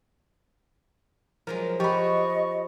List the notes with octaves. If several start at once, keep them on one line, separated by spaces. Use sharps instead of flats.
F3 F#3 G#3 A#4
F3 F#4 G4 D#5 B5 C#6